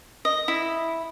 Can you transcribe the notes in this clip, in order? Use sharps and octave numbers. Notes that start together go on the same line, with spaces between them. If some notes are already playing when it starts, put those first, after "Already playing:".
D#5
E4